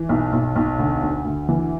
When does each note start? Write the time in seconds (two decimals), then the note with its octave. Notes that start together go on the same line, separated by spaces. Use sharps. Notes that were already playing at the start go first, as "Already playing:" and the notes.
Already playing: E3
0.09 B1
0.33 B1
0.56 B1
0.79 D2
1.02 D2
1.25 D2
1.49 E3